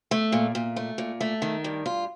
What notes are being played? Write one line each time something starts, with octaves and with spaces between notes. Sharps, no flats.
A3
A#2
A#2
A3
A#2
A3
D#3
G2
F4